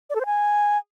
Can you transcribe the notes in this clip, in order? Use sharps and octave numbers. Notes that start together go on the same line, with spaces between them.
D5
A4
C5
G#5